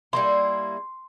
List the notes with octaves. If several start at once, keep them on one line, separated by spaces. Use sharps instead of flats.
G3 A#3 E4 C6